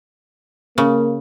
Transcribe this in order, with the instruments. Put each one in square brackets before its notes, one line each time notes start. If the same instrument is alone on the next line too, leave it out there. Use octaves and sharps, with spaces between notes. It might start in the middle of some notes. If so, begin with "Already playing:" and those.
[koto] C#3 [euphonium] A#3